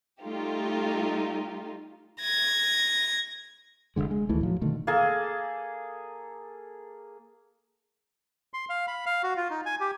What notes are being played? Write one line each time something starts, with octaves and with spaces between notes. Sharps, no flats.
G3 A3 D#4 F4 G4
G#6 A#6
F1 C#2 D3 G#3
G#3
D2 D#3 E3 A3
A2 F3 F#3
B2 D3 D#3 A3
A#3 G#4 A4 A5
C6
F5
B5
F5
F#4
F4
D#4
G#5
G4